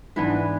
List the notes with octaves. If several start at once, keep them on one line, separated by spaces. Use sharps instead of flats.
G#2 E3 B3 D4 B4